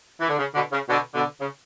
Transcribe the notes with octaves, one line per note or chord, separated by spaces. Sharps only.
E3
D3
C#3
B2 D3
C#3
B2 D3
B2 D3
C#3